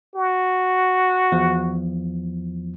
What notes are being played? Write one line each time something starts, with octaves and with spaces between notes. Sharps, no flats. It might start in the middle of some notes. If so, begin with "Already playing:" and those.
F#4
E2 F3